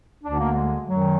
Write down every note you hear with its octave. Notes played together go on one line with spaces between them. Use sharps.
D2 D3 D4
A#3
G#3
F#2 D#3 F#3